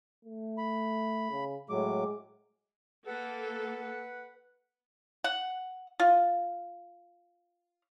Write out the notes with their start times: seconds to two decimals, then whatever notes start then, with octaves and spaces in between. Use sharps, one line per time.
0.25 A3
0.58 B5
1.31 C#3
1.70 A2 F#3 G#3 D6
3.07 A#3 A4 B4 F#5
5.24 F#5
6.00 F4